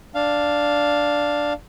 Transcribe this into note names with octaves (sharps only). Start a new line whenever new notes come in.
D4 F5